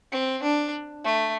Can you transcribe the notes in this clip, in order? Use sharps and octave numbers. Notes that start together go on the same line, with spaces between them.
C4
D4
A3